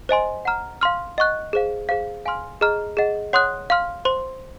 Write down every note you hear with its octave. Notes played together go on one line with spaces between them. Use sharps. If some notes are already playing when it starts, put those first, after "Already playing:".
C5 D#5 G#5 C6
F#5 A#5 F6
F5 C6 F6
D#5 F#5 C#6 F#6
G#4 C5 F5
G#4 C5 F5
F5 G#5 C6 F6
G#4 D#5 A#5 F6
G#4 D#5 F#5
C#5 F#5 C6 D#6 F#6
F5 C6 F6
C5 C6